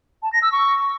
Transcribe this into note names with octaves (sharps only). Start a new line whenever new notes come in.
A5
A#6
E6
C#6